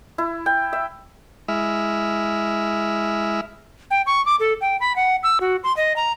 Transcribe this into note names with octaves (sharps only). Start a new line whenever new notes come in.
E4
G5
E5
G#3 E4 E5 F6
G5
C#6
D6
A4
G5
B5
F#5
E6
F#4
C6
D#5
A#5